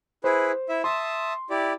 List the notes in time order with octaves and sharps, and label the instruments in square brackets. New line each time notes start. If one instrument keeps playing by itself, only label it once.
[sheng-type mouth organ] E4 G#4 B4 [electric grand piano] C5
[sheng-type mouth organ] E4 E5
[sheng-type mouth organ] E5 A5 D#6 [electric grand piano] C6
[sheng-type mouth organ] E4 G4 D5